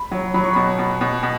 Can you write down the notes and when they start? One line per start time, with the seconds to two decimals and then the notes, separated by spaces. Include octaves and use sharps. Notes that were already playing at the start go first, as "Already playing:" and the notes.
Already playing: B5
0.11 F#3
0.34 F#3 B5
0.44 C#6
0.53 B2 B5
0.79 B2
1.01 B2
1.23 B2